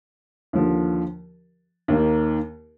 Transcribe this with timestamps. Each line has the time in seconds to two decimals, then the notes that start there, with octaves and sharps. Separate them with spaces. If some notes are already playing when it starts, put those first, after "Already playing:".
0.53 D#2 D3 F3
1.88 D#2 D#3 A#3